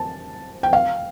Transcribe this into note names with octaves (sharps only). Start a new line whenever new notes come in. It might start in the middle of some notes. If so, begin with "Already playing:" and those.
Already playing: A5
G5
F5